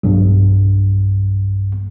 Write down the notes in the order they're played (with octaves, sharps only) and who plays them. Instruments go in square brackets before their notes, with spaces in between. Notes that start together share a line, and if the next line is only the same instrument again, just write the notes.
[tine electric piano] B1 G2